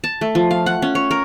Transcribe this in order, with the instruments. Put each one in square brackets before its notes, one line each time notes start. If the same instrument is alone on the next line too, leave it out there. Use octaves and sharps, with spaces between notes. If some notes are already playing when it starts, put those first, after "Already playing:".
[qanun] A5
A3
F3
F5
F#5
C#4
C#5
A#4